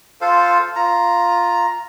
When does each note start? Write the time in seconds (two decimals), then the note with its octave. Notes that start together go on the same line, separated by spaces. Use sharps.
0.21 F4 A4 C5 F5
0.76 F4 A#5